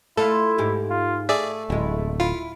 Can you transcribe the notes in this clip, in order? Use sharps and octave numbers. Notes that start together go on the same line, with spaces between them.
A3 E4 F4 A4
G#2 G4
F4
A3 G#4 D5 E5
D1 G#3 E4
E4 F4